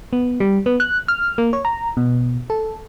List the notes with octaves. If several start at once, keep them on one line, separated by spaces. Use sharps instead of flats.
B3
G3
B3
F#6
F6
A#3
C#5
A#5
B2
A4